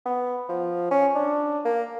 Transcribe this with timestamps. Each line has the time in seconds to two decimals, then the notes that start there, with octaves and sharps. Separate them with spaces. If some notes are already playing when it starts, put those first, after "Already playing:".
0.06 B3
0.49 F3
0.91 C#4
1.15 D4
1.65 A#3